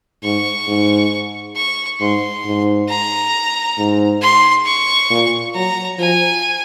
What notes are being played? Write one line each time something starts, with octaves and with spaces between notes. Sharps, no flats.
G#2 C#6
G#2
C#6
G#2 C6
G#2
A#5
G#2
C6
C#6
A#2
F#3 A#5
F3 G#5